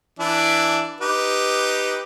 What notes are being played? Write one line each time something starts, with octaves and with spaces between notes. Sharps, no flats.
E3 D4 E5
D#4 G4 B4